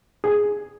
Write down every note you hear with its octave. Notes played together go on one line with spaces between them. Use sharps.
G#4